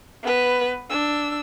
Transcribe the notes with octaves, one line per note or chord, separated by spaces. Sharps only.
B3 B4
D4 E6